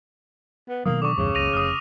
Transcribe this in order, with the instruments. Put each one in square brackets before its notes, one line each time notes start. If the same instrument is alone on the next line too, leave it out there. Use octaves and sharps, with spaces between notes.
[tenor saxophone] B3
[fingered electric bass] B2 D#3 F#3 [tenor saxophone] A#3 [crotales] D#6
[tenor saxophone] D3 [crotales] C#6 D6
[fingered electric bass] B1 E2 G2 [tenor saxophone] C#3
[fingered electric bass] F#1 C#2 [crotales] A#6 D#7 F7
[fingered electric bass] F1 [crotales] D#6 F6